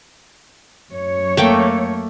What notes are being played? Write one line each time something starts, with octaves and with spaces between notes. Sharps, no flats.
F#2 C#5
A3 A#3 G5